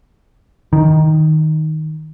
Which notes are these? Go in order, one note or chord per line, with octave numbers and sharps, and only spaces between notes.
D#3